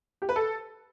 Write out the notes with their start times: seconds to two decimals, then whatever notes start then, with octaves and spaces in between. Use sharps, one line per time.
0.22 G4
0.29 B4
0.36 A4